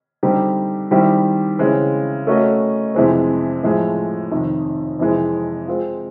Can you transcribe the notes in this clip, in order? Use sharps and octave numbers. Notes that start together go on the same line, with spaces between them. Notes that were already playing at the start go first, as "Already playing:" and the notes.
D3 G3 C4 D#4 G4
D#3 G3 C4 E4 G4
C#3 E3 G#3 C4
A3 C#4 F#4 A#4 D#5
F2 C3 E3 G#3 C4
A2 F3 G#3
F2 C3 D#3
F2 C3 E3 G#3 C4
G#3 C4 F4